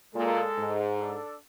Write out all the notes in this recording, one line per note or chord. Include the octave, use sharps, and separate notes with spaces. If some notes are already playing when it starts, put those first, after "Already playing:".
A#2 G#3 A4
G#2
D4 A4